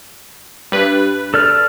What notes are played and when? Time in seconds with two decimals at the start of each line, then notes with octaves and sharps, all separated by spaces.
0.72 G2 B4
1.34 A4 D5 F6